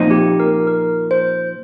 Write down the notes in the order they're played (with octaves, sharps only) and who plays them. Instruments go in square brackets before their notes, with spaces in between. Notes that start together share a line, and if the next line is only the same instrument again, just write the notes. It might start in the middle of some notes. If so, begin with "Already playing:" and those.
Already playing: [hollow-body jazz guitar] A#2 F3 C4 D#4
[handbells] G4
A#4
A#4
C5